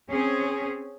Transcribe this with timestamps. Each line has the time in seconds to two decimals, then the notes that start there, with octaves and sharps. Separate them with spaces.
0.11 C4 C#4 G#4